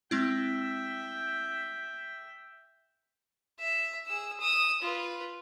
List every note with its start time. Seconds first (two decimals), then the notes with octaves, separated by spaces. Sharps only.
0.11 G#3 C4 E4 E5 G5
3.59 E5
4.07 G#4 E6
4.40 D#6 E6
4.82 F4 B4